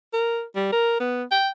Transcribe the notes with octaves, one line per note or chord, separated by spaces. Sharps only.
A#4
G3
A#4
B3
G5